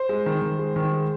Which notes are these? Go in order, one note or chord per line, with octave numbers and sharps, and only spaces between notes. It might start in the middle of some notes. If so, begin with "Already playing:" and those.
Already playing: C5
G#3
D#3
D#3
G#3
D#3
G#3